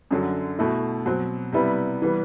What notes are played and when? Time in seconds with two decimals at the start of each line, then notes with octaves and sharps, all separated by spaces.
0.11 F#2 D3 F#3
0.59 B2 A3 E4
1.06 B2 F#3 C4
1.52 C3 G3 B3 E4
2.02 E3 G3 B3